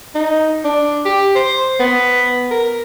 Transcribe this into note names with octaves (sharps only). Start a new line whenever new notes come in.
D#4
D4
G4
C5
B3
A#4